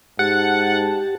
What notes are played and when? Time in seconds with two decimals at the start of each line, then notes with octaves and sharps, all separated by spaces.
0.19 G#2 G4 F#5 A5